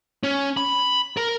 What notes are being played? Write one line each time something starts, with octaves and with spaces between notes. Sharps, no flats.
C#4
B5
A#4